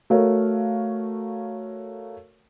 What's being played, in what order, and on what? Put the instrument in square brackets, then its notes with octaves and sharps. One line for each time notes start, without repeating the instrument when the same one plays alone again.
[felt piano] A3 F#4 A4 A#4 C#5 F5